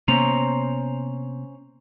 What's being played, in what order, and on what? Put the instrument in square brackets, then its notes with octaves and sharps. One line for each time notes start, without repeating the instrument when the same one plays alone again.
[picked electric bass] C3 A#3 B3 [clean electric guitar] C#4 C5 A#5